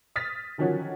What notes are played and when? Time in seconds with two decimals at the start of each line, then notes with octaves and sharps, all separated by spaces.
0.16 D#6 F6 A6 B6
0.58 D3 D#3 F3 F#3 C#4 F#4